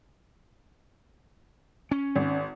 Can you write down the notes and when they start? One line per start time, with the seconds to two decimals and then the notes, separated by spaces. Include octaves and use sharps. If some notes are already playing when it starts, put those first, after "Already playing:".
1.91 C#4
2.16 G#1